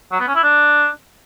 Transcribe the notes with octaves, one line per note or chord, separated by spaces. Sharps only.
F#3
B3
C#4
E4
D4